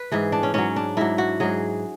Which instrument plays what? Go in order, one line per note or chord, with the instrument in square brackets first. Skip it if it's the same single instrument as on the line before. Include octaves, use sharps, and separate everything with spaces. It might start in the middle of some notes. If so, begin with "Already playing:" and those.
Already playing: [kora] B4
G#2 E3 G#4
D4
C#4
G#2 F#3 C#4
D4
G#2 F#3 E4
F#4
G#2 F#3 G#4